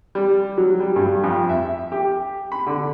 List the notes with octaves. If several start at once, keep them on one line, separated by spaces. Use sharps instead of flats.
G3
F#3
G3
G2
F2
E5
G4
B5
D3